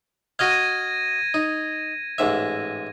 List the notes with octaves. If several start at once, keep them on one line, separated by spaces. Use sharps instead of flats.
F#4 D#5 F5 G#6 A#6 D#7
D#4
A1 G#2 E5